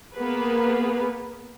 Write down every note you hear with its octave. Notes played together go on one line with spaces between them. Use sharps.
A#3 B3 G#4 B4